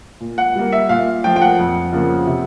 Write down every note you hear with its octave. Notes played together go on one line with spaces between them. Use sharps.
A#2
F#5
G3 A#3
E5
A#2 F5
F3 A3 G5
G5
F#5
F2
C#3 F3 A#3
C3